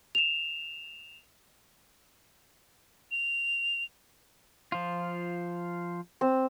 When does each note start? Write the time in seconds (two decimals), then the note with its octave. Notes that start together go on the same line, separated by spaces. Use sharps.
0.15 E7 F7
3.11 F7
4.72 F3 F4
6.21 C4